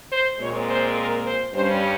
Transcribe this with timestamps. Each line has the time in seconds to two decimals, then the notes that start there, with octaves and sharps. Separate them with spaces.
0.11 C5
0.40 A#2 G#3 C4 C#5
0.68 C5
0.96 A#4
1.25 C5
1.53 G2 G3 C#4 C5